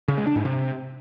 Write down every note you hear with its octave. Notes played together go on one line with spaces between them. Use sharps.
C#3
G#3
D4
G#2
C3